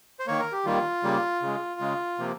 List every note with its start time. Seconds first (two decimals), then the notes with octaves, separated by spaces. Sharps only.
0.20 C5
0.27 D#3 A#3 C#5
0.40 A#4
0.52 G4
0.65 D#3 G3 A#3 F4
1.03 C#3 G3 A#3
1.42 C#3 G#3
1.81 C#3 G#3
2.19 C3 F3 A#3